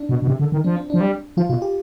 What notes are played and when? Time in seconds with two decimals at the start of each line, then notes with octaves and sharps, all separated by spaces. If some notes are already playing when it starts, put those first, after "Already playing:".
Already playing: D4
0.09 B2
0.22 B2
0.28 C3
0.40 D3
0.52 D#3
0.64 F3 D4
0.76 C4
0.90 F3 D4
1.01 G3
1.37 F3 F4
1.50 B2 F4
1.62 G4